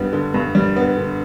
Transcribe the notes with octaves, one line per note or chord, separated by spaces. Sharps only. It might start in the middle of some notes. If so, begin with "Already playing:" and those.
Already playing: G2 G3 B3
D3
G2
G3
B3
D3